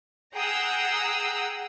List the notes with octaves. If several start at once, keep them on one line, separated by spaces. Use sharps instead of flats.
G#4 F#5 G5 A#5 D#6 E6